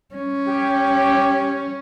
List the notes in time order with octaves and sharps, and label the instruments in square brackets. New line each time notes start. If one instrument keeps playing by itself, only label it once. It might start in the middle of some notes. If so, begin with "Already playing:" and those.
[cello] C#4
[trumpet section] G4